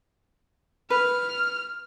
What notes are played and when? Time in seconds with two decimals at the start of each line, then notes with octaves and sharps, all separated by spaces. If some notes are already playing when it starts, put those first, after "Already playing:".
0.90 B4 F6